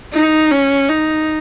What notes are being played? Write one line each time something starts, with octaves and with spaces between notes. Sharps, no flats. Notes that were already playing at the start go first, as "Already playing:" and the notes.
D#4
C#4
D#4